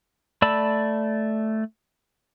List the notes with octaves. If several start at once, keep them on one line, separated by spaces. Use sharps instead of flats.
A3 D5 A5 B5 E6